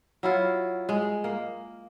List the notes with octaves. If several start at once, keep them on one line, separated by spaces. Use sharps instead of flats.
F#3 E4 F4
G#3
A#3